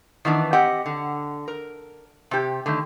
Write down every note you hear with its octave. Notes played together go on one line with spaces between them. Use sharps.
D#3 E3 B3 D4
C4 G4 D#5 F#5
D3
A#4
C3 G4
D3 D#3 A3